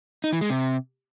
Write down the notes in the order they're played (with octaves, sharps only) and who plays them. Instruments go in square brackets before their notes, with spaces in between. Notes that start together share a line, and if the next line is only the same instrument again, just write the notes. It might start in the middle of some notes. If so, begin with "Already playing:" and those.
[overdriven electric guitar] D#4
E3
G#3
C3